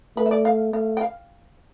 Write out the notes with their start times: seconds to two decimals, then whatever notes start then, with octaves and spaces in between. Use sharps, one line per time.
0.16 A3 B4
0.26 E5
0.31 D5
0.45 F5
0.73 A3 F5
0.97 G5
1.01 F5